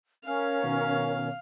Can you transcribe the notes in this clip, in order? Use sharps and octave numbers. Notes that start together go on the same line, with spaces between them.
C#4 A#4 F5
B2 D#3 B3